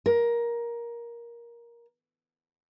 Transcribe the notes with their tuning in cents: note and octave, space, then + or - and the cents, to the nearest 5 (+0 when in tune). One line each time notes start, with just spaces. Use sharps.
A#4 +15